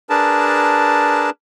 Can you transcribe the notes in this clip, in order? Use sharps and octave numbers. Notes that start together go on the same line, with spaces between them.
D4 G#4 A#4 B4 A5